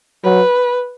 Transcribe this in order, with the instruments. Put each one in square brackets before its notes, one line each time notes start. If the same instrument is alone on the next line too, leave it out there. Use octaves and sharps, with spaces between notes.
[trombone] F#3 [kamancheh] B4